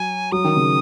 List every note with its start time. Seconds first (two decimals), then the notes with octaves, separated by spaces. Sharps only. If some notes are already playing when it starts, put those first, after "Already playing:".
Already playing: F#3 G#5
0.32 F#3 D#6
0.44 D#3
0.56 C#3